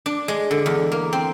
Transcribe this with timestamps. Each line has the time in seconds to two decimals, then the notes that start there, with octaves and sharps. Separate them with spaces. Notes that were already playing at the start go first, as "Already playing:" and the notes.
0.06 D4
0.28 G#3
0.51 D3
0.66 E2
0.92 A#3
1.13 C4